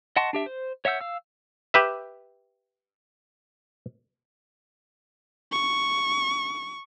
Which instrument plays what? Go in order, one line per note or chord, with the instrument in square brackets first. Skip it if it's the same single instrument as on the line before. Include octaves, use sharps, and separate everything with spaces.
[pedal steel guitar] D#5 F#5 A5 C6 C#6
D4 G4 E5
C5
C#5 E5 F#5 E6 G6
F5 E6
[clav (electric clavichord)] G4 B4 E5
[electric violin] C#6